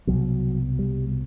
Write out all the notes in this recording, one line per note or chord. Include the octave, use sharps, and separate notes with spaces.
C2 B2 F#3
G3